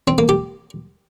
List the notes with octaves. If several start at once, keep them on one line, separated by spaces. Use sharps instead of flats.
C4
A#3
G4